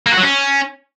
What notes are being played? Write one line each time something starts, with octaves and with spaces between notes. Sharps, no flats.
A#3
F#4
F#3
C#4